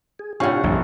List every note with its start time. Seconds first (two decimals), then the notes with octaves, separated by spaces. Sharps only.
0.19 G#4
0.40 A2 C3 C#4 D4 F4 G4 F#5
0.64 A#1 F#2 D3 G3